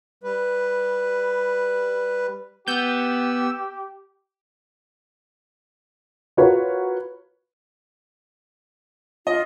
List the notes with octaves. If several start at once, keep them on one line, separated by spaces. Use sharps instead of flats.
G3 B4
B3 G4 E6 G6
F4 F#4 A#4 B4 C#5
F4 D#5